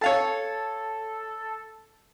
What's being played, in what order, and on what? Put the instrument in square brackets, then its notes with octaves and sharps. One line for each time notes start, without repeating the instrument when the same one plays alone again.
[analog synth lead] A4 [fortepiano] C#5 F5 A5